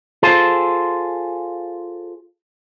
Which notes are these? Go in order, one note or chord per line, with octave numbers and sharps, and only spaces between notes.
F4 G#4 A4 C5